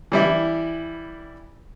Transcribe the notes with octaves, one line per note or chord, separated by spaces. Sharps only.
E3 G3 E4